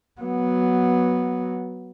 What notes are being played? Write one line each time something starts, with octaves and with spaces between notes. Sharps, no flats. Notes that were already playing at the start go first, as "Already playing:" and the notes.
F#3 B3